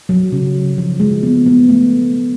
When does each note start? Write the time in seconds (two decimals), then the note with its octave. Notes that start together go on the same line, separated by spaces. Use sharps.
0.09 F#3
0.32 C#3
0.78 F3
1.00 G#3
1.23 B3
1.46 B3
1.69 A3